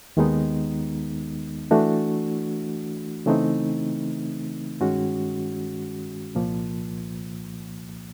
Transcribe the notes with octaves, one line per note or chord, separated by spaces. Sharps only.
D#2 D#3 G#3 B3 D#4
E3 A3 D4 F#4
C#3 E3 A3 C4 D#4
G2 D#3 G#3 C#4 F#4
C2 A#2 F3 A#3